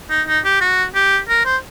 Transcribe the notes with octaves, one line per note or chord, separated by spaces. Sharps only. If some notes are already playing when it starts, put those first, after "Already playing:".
D#4
D#4
G4
F#4
G4
A#4
C5